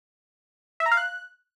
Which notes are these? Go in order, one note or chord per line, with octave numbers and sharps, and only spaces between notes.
E5
A#5
F5
F#6